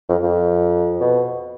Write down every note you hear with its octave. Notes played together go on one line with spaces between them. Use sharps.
F2
F2
B2